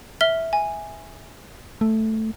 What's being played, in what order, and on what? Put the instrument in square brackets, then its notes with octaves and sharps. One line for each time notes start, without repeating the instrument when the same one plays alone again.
[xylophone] E5 F6 G7
G#5
[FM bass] A3